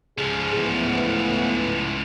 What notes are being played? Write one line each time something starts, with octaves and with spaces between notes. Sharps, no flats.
C#2 F3 G#4
A2 E3 B3